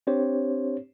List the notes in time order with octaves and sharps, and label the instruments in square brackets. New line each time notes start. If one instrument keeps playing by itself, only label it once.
[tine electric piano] C4 D4 G4 C5 C#5